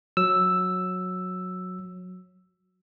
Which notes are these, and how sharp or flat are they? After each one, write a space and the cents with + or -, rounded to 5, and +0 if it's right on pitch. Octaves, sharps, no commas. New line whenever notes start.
F#3 -15 E6 +0